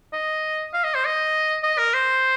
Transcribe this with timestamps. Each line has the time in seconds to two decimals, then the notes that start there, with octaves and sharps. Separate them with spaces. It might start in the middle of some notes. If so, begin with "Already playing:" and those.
0.13 D#5
0.73 F5
0.84 D#5
0.94 C5
1.05 D#5
1.63 D#5
1.78 A#4
1.94 C5